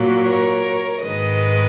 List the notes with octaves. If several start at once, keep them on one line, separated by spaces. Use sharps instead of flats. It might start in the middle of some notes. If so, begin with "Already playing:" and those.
Already playing: A#2 F#3
A#4 C#5
G#2 D#3 G#3 B4 D#5